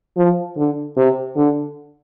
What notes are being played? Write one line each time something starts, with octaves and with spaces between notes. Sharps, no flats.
F3
D3
C3
D3